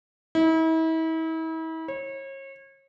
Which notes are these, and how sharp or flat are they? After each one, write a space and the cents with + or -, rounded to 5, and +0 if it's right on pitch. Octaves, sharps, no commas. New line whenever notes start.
E4 -40
C#5 -35